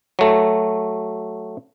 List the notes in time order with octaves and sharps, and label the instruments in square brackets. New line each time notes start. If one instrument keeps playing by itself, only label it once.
[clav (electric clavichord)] F#3 A3